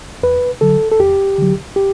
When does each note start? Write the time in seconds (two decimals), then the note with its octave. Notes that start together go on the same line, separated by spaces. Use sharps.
0.23 E2 B4
0.61 D3 F#3 A4
0.91 A4
1.00 E2 G4
1.38 D3 F#3
1.76 G4